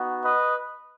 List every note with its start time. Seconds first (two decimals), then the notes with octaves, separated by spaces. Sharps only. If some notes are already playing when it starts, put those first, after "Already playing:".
Already playing: B3 D#4 F#4
0.25 B4 D#5